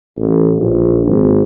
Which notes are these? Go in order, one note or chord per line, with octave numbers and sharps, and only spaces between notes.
A1
A#1
G#1